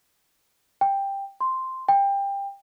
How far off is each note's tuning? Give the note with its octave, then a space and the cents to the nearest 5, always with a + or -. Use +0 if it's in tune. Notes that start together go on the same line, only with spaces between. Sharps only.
G5 +10
C6 +0
G5 +20